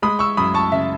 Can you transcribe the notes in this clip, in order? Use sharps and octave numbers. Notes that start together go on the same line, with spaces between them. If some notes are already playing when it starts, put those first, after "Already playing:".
G#3 B5 D#6
C#6 E6
F#2 B5 D#6
A5 C#6
C#3 E5